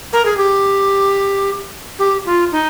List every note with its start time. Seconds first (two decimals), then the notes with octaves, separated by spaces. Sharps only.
0.13 A#4
0.25 G#4
0.37 G4
1.99 G4
2.26 F4
2.51 D#4